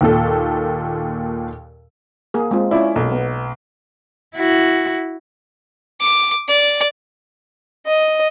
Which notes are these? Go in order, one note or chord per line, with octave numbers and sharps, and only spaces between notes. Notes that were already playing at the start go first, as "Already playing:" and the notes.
D#2 A#2 A4
A#3 G#4
G#3 C4 F4
C#4 E4 F4 D5
B1 A#3
B3
E4 F#4
D6
D5
D#5